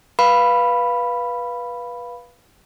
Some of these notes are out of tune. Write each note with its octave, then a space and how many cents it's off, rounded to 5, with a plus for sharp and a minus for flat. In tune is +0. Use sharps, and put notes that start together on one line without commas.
B4 -20 F5 +0 B5 +0